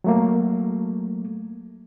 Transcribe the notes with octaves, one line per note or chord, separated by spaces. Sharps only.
F#3 A3 A#3